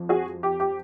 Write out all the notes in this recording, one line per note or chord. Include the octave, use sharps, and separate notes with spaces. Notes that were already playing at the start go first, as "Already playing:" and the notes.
Already playing: F2 F3
F#4 G#4
G4
G4